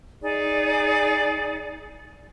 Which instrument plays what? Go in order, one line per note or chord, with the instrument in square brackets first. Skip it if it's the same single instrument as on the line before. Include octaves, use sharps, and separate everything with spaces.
[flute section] D#4 G#4 D5